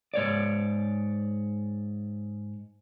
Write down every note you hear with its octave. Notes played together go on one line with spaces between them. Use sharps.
G#2 C#5 D5